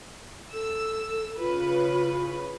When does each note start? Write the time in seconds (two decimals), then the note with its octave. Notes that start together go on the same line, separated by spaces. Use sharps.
0.53 A4 E6
1.39 C#3 F4 B4